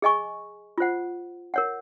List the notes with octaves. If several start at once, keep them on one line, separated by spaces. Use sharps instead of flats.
G#4 D#5 G#5 C#6
F4 C5 F#5
A#4 C#5 F#5